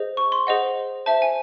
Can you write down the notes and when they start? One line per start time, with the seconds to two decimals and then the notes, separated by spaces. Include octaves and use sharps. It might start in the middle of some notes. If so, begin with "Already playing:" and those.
Already playing: G#4 C5 D#5
0.17 C#6
0.32 C6
0.47 G#4 C5 D#5 F#5
1.06 C5 E5 A5
1.22 G#5